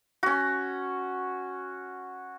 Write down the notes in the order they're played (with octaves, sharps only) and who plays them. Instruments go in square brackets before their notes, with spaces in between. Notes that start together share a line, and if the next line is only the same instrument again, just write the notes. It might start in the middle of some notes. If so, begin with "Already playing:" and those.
[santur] C#4 F#4